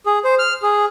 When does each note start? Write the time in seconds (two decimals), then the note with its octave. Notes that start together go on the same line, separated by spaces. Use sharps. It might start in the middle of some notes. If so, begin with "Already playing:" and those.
0.06 G#4
0.25 C5
0.39 F6
0.63 G#4